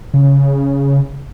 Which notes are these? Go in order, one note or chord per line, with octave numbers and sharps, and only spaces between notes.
C#3